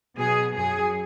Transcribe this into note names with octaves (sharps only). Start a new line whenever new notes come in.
B2 F#3 G#4
F#2 F#3 G#4